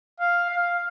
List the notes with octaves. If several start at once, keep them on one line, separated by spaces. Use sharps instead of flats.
F5
F5